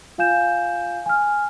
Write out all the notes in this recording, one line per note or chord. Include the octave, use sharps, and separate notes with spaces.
F4 F5 G#5 G6 E7
G#5 F6